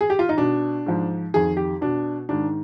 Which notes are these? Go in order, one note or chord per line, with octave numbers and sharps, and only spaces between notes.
G#4
G4
F4
D#4
B2 D4
G#2 F3
F2 D#3 G#4
G4
B2 D4
G#2 D#3 D4